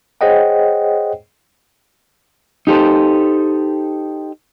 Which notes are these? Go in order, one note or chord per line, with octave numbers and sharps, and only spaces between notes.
G#4 C5 C#5 D#5 F#5 G5
D#4 G4 A4 C5